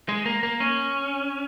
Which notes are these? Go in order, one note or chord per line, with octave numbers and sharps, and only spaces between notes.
G#3
A#3
A#3
C#4